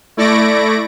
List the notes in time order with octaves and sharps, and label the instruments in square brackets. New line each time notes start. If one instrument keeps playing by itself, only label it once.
[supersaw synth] A3 E4 D5 C#6 A#6 D7